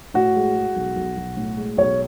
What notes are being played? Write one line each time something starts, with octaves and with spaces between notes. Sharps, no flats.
A2 F#4
G#3
G#3
B1
B1
B1
A2
G#3
B1 C#5